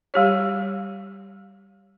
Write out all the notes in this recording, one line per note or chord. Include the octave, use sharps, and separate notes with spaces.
G3 G4 C#5